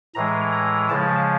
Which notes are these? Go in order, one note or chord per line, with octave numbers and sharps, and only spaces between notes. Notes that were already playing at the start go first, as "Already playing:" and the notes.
A2 E3 G#3 A#5
A#5
C#3 F3 G#3 A5